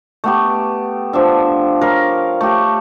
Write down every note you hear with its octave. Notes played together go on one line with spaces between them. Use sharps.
A3 B3 G4
F3 D4 E5
A#4 C#5 F5
A3 G4